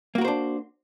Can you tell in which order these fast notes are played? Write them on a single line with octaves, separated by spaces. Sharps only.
A#3 F#4 A#4 C5 D4